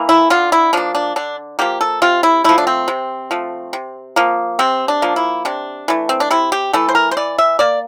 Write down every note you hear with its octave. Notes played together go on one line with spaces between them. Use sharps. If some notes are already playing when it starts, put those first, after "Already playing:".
Already playing: E3 A#3
E4
D3 F4
E4
F3 A#3 D4
D4
D3 D4
F3 A#3 G4
A4
C3 F4
E4
F3 A3 E4
D4
C4
C3
F3 A3
C3
F3 A#3
C3 C4
D4
F3 A#3
E4
C3 D4
E3 A3
C4
D4
C3 E4
G4
E3 A3 A4
C5
A#4
C5
E3 D5
E5
A#3 D5